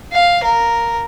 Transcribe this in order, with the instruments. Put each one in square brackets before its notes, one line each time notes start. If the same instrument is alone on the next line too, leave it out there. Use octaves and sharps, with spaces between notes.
[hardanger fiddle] F5
A#4